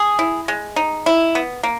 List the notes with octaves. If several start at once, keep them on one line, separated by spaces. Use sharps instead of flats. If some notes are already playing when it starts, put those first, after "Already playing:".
Already playing: G#4
E4
G#3
D#4
E4
B3
A#3